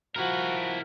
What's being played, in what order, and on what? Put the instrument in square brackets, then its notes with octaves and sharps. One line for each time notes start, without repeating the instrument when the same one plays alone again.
[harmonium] F3 [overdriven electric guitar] E4 A#4 [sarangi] F#4